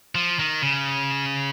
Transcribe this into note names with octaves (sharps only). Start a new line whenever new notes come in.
F3
D#3
C#3